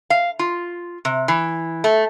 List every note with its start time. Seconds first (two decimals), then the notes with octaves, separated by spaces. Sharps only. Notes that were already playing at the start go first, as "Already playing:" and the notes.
0.10 F5
0.39 F4
1.05 C3
1.28 E3
1.84 A3